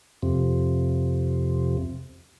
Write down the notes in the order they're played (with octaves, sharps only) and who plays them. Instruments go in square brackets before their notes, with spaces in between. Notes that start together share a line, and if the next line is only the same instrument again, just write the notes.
[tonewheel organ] F2 C3